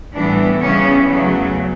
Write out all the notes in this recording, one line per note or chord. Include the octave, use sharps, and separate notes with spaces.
A2 E3 G3 B3 D4
C#3 E3 G3 B3 C#4
E2 C#3 F#3 A3